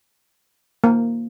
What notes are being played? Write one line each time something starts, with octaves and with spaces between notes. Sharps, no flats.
A#3